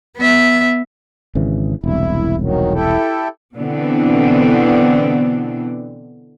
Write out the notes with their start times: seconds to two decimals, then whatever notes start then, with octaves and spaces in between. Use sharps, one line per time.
0.17 B3 E5
1.35 G#1 C#3 E3
1.84 E1 C2 E4
2.41 D#3 F#3
2.73 E4 G4 A4
3.56 B2 D3 E3 B3 C4 D4